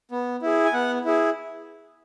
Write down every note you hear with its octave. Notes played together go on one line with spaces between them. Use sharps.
B3
E4 G#4
G#5
B3 F#5
E4 G#4